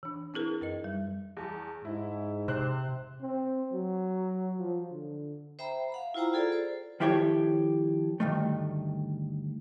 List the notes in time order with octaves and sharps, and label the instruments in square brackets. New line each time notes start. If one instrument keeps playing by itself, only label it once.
[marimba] E3 D4
C4 E4 G#4 A#4 B4
F#2 B4 D#5
G3
[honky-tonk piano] E2 A5
[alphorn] G#2 [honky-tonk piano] E4
[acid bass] C3 [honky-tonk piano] C5 F#6
[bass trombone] C4
F#3
F3
D3
[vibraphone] C5 E5 G5 A#5 B5
F5 F#5 B5
E4 F4 C5 G5 A#5
F4 G#4 A4 D5
C5
[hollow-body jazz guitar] D#3 F3 E4 G4 A4 C#5
D2 G2 D#3 A3